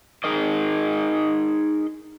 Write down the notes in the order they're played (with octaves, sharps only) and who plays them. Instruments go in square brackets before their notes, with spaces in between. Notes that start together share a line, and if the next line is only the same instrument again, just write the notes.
[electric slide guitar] D#4 G#4 A#4 D#5